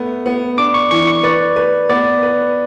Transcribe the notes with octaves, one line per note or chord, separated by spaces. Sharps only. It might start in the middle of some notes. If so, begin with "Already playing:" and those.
Already playing: A3 B3
B3
D4 D6
C#6
E3 C#6
C#6
B4 D5
B4
B3 D5
B4